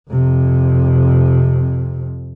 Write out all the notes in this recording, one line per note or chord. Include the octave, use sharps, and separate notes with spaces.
F2 C3